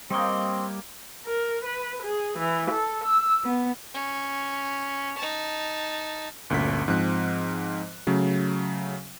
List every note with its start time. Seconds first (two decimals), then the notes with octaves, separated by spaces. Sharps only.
0.10 G3 A#3 C4 C#5 D#5 G5
1.26 A#4
1.65 B4
2.04 G#4
2.38 E3
2.72 A4
3.04 E6
3.43 B3
3.94 C#4
5.18 D#4 A5
6.50 G1 D2 A#2 C#4 B6
6.88 G#2 F3 C4 F#6
8.07 C#3 F#3 A3